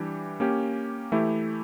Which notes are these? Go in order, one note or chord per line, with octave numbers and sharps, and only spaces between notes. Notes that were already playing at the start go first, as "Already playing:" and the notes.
Already playing: E3 G3 D4 G4
A#3 C#4 G4
E3 A3 E4 G4